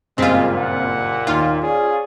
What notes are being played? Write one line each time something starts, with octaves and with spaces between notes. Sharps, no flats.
F#1 G2 A#2 G#3 C4 F4 B6
F#5
D#2 D#3 F4 C6
C#4 G#4 D5